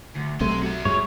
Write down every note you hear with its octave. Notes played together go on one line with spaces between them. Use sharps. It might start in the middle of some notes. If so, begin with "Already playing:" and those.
D2
B1 C3 A3 G#4 C6
F#4 E5
G2 G#3 C#5